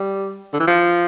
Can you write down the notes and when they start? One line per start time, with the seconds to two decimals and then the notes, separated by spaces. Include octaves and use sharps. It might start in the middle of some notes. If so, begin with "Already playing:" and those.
Already playing: G3
0.53 D3
0.60 E3
0.67 F3